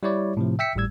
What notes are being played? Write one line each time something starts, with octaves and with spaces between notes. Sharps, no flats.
G3 E4 C#5 D5
A2 C3 F3
E5 G5 E6 B6 C#7
G#1 A2 G3 E6 G#6